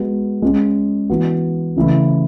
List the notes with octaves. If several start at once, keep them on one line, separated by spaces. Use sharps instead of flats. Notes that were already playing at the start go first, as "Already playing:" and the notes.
Already playing: G#3 B3 F#4
G#3 C#4 G#4
E3 B3 F#4
C#3 E3 A3 E4